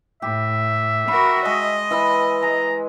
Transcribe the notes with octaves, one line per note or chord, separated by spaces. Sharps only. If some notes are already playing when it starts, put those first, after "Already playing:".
A2 G4 E5
F#4 A#4 B5
G#3 D#5
E3 E5 B5
G#3 A#5